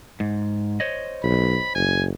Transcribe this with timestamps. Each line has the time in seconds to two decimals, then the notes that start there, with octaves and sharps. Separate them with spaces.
0.20 G#2
0.80 C5 C#5 D#5
1.23 B1 B5
1.75 F#1 G#5